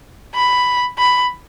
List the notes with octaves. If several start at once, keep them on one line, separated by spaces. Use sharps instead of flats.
B5
B5